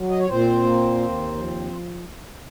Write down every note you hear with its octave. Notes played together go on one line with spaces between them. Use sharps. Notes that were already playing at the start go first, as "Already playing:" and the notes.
Already playing: F#3
D#5
C#5
A#2 C4 C5
A#3
D#2
F3